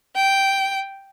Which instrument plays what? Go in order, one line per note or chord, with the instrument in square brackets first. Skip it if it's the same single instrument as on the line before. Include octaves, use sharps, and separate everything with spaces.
[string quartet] G5